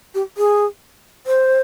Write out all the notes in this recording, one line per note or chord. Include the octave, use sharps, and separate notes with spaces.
G4
G#4
C5